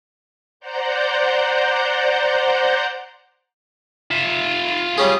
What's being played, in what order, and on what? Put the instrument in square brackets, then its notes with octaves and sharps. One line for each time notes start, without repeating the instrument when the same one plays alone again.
[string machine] C5 D5 F#5 A#5 G6
[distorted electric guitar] F4 E5
[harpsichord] G3 C#4 G#4